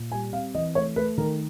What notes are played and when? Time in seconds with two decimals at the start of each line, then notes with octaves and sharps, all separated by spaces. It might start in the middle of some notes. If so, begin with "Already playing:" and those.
Already playing: A#2
0.12 G3 G#5
0.33 C4 F5
0.54 E3 D#5
0.75 A3 C#5
0.96 A3 B4
1.18 D#3 A#4